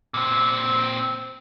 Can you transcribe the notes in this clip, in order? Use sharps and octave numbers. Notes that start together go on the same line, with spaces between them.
A#2 C4